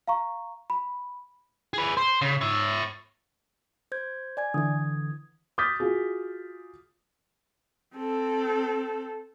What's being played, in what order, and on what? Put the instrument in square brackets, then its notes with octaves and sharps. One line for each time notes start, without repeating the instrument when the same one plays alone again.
[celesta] F5 A#5 C#6
B5
[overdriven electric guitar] G#4 B4
C5
C#3
C#5 E5
[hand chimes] C5 G6 G#6
D5 G#5 G#6
[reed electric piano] D3 E3 [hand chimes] D#6 G#6
[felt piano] D6 D#6 F6 G6 A6 B6
F4 F#4 G#4
[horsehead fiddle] C4 A4